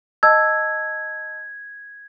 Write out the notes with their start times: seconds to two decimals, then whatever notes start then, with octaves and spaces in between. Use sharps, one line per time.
0.23 D#5 A5 E6 G#6